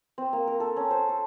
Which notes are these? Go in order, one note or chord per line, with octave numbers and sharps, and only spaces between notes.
C4
A#3
A#4
A4
C#4
C5
A4